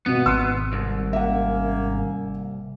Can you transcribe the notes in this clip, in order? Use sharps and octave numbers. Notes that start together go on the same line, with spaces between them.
G#1 B2 B3
G#1 C6 E6
C2
A#3 C#4 E5 F#5